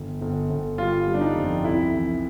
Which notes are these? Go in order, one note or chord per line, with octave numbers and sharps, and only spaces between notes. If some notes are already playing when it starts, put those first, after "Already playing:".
Already playing: G1
G1
G1
G3 F4
G3
D4
D#4
F2
C2 E4
E3